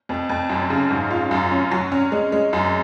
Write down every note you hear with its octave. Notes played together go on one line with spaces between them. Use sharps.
F2
F2
F#2
C#3
G#2
F4
F#2
C#4
F#3
C#4
G#3
G#3
F#2